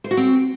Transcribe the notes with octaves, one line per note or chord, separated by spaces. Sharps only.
C5
F#4
C4